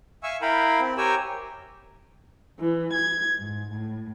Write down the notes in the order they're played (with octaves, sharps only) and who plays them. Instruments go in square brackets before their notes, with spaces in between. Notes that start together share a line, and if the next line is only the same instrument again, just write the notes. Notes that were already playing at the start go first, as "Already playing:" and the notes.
[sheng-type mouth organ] E5 F5 G#5 C#6 E6
E4 A#4 F5 G5 B5
C4
G4 A#4 C#5 G5 G#5 E6
[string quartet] E3
G#6
G#2
A2